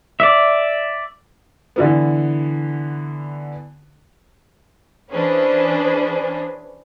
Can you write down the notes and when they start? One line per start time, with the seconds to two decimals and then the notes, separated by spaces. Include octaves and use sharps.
0.20 D5 E5
1.76 D3 E3 B3
5.11 E3 C#4 D4 G#4 B4 C5